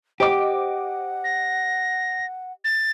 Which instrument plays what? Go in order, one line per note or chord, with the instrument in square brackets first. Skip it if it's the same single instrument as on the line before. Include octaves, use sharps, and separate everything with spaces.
[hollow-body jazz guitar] G4 [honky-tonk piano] C5 D#5 D6 [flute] F#5
[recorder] A#6
A6